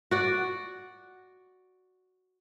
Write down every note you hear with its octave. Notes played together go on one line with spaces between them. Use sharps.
F#4 D5